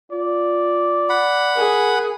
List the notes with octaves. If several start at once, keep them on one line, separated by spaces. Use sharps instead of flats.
F4 D5
F#5 B5
G#4 A#4